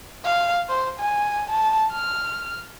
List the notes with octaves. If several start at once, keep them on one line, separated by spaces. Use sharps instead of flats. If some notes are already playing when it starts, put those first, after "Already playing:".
F5
C5
G#5
A5
F6